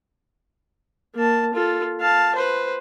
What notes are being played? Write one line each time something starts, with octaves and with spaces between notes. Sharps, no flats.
A#3 A5
F4 A4
F5 A5
B4 C5